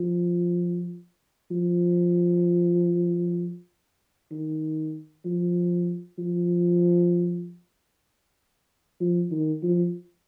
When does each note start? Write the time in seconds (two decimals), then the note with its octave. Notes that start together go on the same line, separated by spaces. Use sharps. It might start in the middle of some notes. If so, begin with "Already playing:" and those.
Already playing: F3
1.51 F3
4.31 D#3
5.25 F3
6.18 F3
9.00 F3
9.31 D#3
9.63 F3